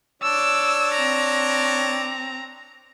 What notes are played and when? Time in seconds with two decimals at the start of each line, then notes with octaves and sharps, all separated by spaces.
0.22 D4 C#5 D5 E6
0.94 C4 A#5